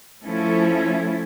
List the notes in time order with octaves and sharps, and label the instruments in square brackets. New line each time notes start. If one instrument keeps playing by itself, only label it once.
[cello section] F3 A3 C#4 E4 A4